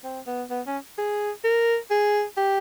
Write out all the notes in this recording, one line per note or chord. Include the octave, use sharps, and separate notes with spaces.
C4
B3
B3
C#4
G#4
A#4
G#4
G4